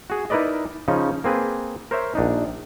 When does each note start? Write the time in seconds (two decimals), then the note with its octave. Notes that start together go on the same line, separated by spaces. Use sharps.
0.10 F#4 G#4
0.30 D#4 E4 A#4 B4 D5 D#5
0.88 C#3 F3 C#4 D#4
1.24 A#3 C4 G#4 B4
1.91 A#4 C5 C#5 E5
2.15 A#1 D4 D#4